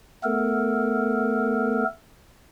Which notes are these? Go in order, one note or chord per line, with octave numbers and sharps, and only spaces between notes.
A3 B3 A4 A#4